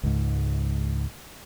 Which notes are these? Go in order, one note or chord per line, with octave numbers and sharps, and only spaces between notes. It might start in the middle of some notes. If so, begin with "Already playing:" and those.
C#2 G#2